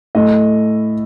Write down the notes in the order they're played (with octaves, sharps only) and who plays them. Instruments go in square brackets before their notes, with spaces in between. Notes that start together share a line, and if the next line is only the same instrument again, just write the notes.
[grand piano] A2 A3 D#5